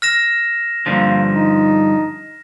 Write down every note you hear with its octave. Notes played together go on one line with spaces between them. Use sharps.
F6 A#6 E7
G2 D3 F3 A#3
D#4